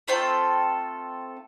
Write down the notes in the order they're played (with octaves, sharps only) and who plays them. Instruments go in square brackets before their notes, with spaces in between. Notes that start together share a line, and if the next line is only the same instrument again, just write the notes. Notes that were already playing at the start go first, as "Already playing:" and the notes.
[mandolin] A3 C4 F4 A4 G5